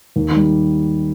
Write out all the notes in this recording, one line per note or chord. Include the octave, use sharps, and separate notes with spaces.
D#2
D#3 G3